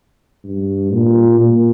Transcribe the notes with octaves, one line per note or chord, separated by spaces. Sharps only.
G2
A#2
A#2